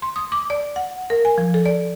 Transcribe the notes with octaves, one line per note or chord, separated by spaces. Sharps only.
C6
D#6
D6
D5
F#5
A#4
G#5
F3
A4
D5